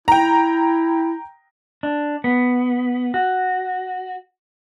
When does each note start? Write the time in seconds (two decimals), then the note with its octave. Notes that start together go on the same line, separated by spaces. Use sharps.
0.08 E4 G5 A#5
1.83 D4
2.24 B3
3.14 F#4